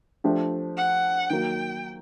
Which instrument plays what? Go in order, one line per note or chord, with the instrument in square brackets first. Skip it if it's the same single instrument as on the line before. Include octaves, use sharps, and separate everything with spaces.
[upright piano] F3 A3 D4 G4
[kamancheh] F#5
[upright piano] D#3 F#3 A#3 [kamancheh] G5